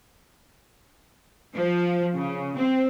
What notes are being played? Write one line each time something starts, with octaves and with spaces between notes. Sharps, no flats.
F3
C#3
C4